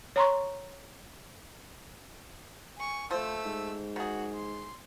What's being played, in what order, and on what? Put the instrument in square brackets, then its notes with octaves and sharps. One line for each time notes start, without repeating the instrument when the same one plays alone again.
[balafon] C#5 A#5 C6 C#6
[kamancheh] G#5 C#6
[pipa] F3 C5 [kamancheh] A3 E6
[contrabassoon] G#2
[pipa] D#3 G#4 [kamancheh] F#4
[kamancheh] C6